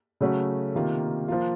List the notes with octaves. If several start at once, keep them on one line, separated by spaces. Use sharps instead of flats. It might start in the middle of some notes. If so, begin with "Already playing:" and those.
C#3 F#3 A3 C#4 F#4
C3 D#3 A#3 F4
F3 A#3 F4